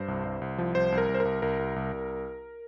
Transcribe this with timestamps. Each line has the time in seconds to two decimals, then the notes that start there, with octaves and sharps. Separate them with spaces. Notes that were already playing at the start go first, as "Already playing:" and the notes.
Already playing: G2 C5
0.08 C2
0.25 C2
0.42 C2
0.58 F3
0.75 C2 C5
0.92 C2
0.98 A#4
1.09 C2
1.15 C5
1.20 A#4
1.25 C2
1.42 C2 A#4
1.59 C2
1.76 C2
1.93 C2